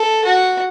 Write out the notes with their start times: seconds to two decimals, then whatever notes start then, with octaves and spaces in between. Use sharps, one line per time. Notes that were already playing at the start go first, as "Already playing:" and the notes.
Already playing: A4
0.24 F#4